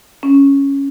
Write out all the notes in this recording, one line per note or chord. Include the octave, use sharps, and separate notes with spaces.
C#4